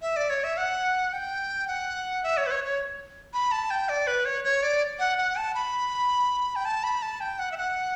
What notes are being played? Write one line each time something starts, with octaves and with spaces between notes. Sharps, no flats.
E5
D5
C#5
E5
F#5
G5
F#5
E5
C#5
B4
C#5
C#5
B5
A5
G5
D5
B4
C#5
C#5
D5
F#5
F#5
A5
B5
G5
A5
B5
A5
G5
F#5
E5
F#5